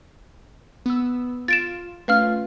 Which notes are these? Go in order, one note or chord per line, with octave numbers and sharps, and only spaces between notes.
B3 E6
F4 A6 D7 E7
A3 C#4 F4 B4 F5 F6